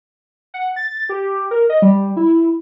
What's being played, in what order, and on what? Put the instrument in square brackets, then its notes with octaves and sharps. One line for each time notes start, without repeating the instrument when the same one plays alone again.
[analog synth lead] F#5
A6
G4
A#4
D#5
G3
E4